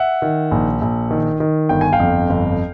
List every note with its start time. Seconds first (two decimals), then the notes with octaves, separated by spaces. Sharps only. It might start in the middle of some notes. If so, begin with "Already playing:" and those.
Already playing: E5 F#5
0.22 D#3
0.51 A#1
0.81 A#1
1.11 D#3
1.40 D#3
1.69 G1 G5
1.81 G#5
1.93 F5 G5
2.00 F2
2.29 G1